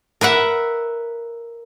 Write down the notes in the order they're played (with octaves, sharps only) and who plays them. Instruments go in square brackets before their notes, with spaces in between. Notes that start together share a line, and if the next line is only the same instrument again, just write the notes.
[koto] A#4 B4 E5 F#5